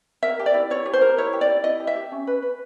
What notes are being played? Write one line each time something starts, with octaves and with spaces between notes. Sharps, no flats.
A#4 E5
G4
D5
E4
E4 C#5
G4
C5
A#4
E4 C#5
G4
D5
E4
E4 D#5
G4
E5
G4
C#4
B4
B4